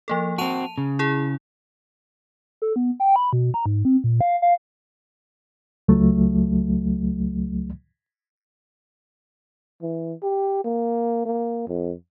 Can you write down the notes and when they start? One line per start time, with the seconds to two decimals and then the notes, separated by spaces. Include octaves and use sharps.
0.08 F3 A#3 A4
0.38 C4 F#4 A5 D#7 F7
0.78 C#3
0.99 E4 G#4
2.62 A4
2.76 B3
3.00 G5
3.16 B5
3.33 B2
3.54 A#5
3.66 G#2
3.85 C4
4.04 A#2
4.21 F5
4.42 F5
5.88 C#2 F#3 A3
9.82 E3
10.23 G4
10.64 A#3
11.26 A#3
11.68 F2